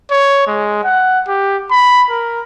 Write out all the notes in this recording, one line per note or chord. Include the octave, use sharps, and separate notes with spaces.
C#5
G#3
F#5
G4
B5
A#4